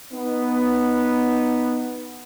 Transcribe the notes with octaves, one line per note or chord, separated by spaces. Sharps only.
B3 D#4